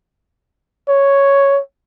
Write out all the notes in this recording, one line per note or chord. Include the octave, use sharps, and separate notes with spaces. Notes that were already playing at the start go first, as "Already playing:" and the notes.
C#5